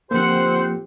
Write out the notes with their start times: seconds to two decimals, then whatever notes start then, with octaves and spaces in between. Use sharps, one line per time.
0.11 F2 F3 A#3 C4 G4 C5 F#5